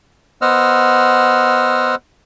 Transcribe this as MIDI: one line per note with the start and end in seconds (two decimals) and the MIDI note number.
0.42 1.95 59
0.42 1.95 72
0.42 1.95 75
0.42 1.95 78
0.42 1.95 88
0.42 1.95 89